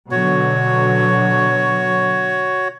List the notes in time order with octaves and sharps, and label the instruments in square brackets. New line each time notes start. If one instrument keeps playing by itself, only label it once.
[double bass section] B2 D3 F#3 [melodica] F#4 C#5